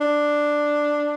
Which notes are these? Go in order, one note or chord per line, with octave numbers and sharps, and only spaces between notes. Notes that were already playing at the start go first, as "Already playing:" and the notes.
D4